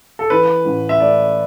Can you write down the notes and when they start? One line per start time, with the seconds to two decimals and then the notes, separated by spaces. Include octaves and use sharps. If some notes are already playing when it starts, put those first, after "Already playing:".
0.19 A4
0.30 E3 B4
0.65 A1
0.89 E5
1.00 A3 D5